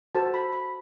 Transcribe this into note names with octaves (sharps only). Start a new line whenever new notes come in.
F#4 A4 C5 A5
B5
B5